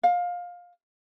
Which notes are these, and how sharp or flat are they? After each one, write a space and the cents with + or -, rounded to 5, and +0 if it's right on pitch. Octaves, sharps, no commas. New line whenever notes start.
F5 +20